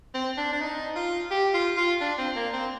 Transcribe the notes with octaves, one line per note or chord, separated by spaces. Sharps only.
C4
D4
D4
D#4
F4
G4
F4
F4
D4
C4
A#3
C4